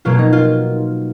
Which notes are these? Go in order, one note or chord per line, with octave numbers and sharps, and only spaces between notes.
B2 F#3 A#3 F4
D#4
F4